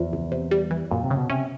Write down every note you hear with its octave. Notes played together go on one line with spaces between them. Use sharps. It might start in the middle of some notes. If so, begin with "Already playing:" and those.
Already playing: E2 F3
C#2
C3
G3
E3
F#2 A#2
C3
C#3
B2
C3 C#4